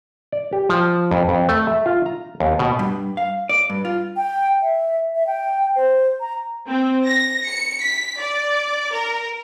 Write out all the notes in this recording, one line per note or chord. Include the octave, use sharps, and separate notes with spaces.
D5
G4
F3
F2
F2
A3
E5
F4
A#5
D#2
B2
G2
F5
D5
G2
F4
G5
E5
E5
G5
C5
A#5
C4
A#6
C#7
B6
D5
A#4